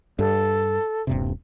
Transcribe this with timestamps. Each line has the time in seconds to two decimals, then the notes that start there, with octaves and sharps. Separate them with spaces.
0.19 G2 A4
1.07 D#1 G2 C3